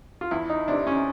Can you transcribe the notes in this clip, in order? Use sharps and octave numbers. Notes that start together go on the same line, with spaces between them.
F4
E2 E4
D#4
C3 E3 D4
C#4